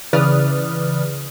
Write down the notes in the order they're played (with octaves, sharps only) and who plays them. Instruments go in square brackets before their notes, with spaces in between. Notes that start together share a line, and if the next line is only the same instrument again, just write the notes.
[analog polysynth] C#3 E3 B4 D5 D#6 F6